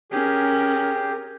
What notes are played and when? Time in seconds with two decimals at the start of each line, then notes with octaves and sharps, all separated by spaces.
0.11 C#4 G4 G#4 A#4